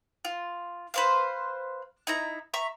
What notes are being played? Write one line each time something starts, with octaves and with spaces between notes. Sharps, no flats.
F4
B4 C5 F5
D#4 E4 A#5
E5 A#5 C#6